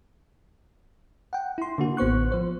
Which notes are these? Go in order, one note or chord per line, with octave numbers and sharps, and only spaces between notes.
F#5 G5
E4 C6
D3 A#3 F#4
A1 B3 C5 C#6 F#6
F3 C5